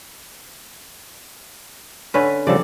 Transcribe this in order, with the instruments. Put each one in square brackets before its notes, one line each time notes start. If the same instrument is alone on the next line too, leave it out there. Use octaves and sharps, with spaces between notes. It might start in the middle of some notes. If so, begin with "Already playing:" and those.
[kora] D3 C#4 B4
[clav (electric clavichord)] C#3 F3 G3 [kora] A4 D5